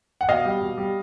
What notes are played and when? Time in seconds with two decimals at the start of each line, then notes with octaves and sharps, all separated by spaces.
0.21 F#5
0.28 B2 D#5 F5
0.45 G3
0.61 B2
0.77 G3